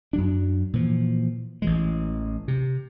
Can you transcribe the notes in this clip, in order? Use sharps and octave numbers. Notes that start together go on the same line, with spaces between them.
F#2 F#3 D4
A#2 E3 F3
A1 E3 G#3
C3